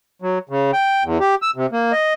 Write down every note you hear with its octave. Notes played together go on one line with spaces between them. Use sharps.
F#3
C#3
G5
E2
G4
E6
C3
A#3
D#5